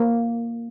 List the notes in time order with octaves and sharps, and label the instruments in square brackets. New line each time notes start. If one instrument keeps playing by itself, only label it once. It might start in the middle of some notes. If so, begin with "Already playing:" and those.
Already playing: [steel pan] A#3